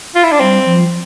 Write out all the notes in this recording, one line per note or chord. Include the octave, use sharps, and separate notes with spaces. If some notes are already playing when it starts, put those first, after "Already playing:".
F4
E4
D4
G3 C4
F3